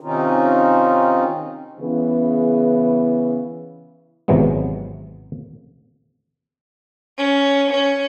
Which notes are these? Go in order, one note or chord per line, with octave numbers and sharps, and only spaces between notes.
C3 D#3 C4 C#4 D#4 F4
C#3 E3 B3
G#1 C3 E3 F#3 G#3 B3
C#4
C#4